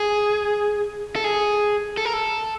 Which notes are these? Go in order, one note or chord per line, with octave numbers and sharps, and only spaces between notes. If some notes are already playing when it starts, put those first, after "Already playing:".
Already playing: G#4
A4
G#4
A4
A#4
A4